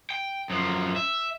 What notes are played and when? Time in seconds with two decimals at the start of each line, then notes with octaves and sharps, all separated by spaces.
0.10 G5
0.50 F#2 F3
0.96 E5